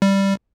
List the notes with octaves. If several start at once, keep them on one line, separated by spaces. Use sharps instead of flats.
G3